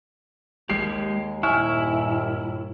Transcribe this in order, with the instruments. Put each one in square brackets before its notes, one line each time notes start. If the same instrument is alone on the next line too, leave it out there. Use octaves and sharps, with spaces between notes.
[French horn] D#2 [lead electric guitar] G#3 G4 [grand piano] C7
[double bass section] G2 A#2 [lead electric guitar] E4 [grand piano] G#5 C#6 F6